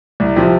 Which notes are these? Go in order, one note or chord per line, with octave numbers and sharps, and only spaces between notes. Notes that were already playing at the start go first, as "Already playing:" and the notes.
C2
C3 F3